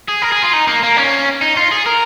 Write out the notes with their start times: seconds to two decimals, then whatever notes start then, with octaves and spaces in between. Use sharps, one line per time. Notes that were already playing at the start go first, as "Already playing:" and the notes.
0.09 G#4
0.22 A#4
0.32 G#4
0.42 F4
0.53 D#4
0.68 A#3
0.83 A#3
0.97 C#4
1.42 D#4
1.57 F4
1.72 G#4
1.86 A#4